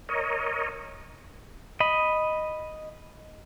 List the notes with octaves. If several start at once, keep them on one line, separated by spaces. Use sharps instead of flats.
A#4 C#5 D#5
D#5 B5